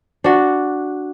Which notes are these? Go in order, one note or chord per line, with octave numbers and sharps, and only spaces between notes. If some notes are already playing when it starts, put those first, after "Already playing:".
D4 F#4